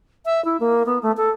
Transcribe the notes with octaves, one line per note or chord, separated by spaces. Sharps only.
E5
E4
A#3
B3
A3
A4